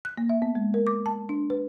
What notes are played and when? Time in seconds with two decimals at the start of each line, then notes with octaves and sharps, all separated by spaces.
0.05 F#6
0.17 A#3
0.29 E5
0.42 B3
0.55 G#3
0.74 A#4
0.87 D6
1.06 A5
1.29 D4
1.50 B4